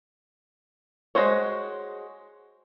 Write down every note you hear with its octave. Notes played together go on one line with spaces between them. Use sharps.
G#3 F4 F#4 C5 C#5